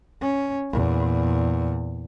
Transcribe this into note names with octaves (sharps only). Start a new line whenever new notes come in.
C#4
E2 A#2